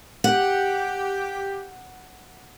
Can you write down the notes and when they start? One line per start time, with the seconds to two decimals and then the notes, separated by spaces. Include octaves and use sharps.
0.24 G4 F#5